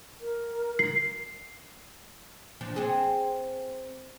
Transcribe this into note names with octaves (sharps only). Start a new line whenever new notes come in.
A#4
C7
F3 D4
C4 G#4